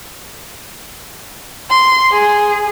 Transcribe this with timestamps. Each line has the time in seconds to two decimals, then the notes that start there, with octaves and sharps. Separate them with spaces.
1.70 C6
2.12 G#4